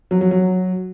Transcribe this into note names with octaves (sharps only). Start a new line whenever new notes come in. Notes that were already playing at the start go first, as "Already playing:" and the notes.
F#3
F#3
F#3